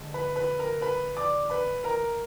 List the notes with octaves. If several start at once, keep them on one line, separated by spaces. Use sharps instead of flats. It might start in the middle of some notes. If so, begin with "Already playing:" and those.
Already playing: D3 G#3
B4 B5
B4 B5
A#4 A#5
B4 B5
D5 D6
B4 B5
A#4 A#5